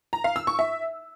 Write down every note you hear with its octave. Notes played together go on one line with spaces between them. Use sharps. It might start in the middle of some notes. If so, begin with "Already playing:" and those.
A#5
F5
E6
C#6
E5